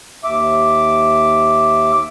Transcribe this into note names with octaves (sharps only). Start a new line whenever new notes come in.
D#2 E5 D6